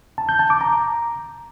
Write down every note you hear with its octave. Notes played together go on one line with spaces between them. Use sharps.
A5
G6
A5
D6
A#5